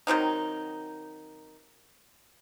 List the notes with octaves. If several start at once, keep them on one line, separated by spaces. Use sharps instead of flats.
D#3 F#3 C4 D#4